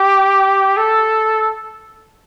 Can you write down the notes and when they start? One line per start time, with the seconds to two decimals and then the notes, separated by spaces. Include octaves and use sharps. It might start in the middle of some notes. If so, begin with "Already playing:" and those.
Already playing: G4
0.77 A4